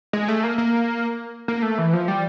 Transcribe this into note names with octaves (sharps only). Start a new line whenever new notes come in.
G#3
A3
A#3
A#3
A#3
A3
E3
F3
G3